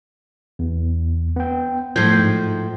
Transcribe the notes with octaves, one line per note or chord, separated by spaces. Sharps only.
E2
B3 G5
A2 F3 G6 G#6 C7
G#2